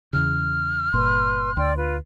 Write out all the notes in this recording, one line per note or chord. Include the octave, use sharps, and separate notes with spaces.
E2 C#3 F6
G1 A#2 B4 C6
D2 D5 G5 C6
F4 B4